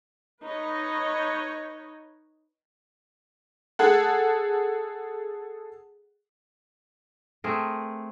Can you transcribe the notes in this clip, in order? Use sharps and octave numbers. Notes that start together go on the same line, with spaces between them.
D#4 B4 C#5 D#5
G#4 A4 F#5
A3 C4 G#4 A#4